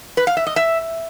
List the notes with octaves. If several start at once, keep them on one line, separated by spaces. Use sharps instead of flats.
B4
F5
E5
D#5
E5